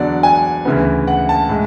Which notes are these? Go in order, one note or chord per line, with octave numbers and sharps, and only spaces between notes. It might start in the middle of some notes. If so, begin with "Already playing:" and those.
Already playing: E2 D3 F#3 D5
G#5
D2 C#3 E3 B3
F#5
A5
A2 G#3